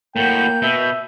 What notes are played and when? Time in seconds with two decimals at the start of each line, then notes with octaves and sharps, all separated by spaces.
0.16 A2 A#3 F#4 G5 G6
0.62 B2 E5